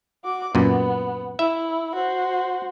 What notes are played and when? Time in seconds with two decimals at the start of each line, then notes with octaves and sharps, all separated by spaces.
0.25 F#4 D6
0.55 F#2 A#2 B3
1.39 E4 E5
1.95 F#4 C5